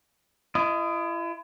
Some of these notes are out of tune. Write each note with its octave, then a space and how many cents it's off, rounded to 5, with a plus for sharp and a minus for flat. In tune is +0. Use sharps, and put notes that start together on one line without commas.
E4 +40 D#5 +0